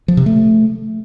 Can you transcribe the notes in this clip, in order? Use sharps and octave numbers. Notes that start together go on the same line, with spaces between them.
F3
C3
A3